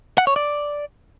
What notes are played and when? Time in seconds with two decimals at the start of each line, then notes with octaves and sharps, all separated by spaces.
0.18 F#5
0.27 C#5
0.36 D5